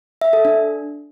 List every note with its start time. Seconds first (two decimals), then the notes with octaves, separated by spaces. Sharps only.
0.22 E5
0.33 A4
0.45 D4